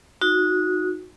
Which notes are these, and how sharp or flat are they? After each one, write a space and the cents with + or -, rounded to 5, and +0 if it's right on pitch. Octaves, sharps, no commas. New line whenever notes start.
D#4 +10 F#4 -20